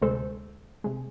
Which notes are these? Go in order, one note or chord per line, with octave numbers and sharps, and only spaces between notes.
D2 C3 G#3 A4 C5
C3 G#3